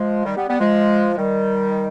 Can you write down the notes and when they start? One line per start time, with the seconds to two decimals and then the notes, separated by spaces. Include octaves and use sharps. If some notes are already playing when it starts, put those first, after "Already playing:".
Already playing: F3 G#3
0.25 D#3 G3
0.37 G3 B3
0.48 G3 B3
0.59 F3 G#3
1.13 G#3
1.17 D#3 G3